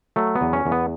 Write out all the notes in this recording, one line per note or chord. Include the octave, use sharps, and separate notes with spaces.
F#3 A3
B3
E2
C#4
E2
B3